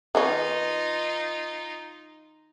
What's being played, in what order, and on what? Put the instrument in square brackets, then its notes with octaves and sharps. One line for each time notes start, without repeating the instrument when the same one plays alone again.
[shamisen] D#3 B3 C#4 [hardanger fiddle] D#4 F4